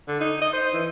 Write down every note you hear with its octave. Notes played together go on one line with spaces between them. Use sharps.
D3
D#4
D#5
C5
E3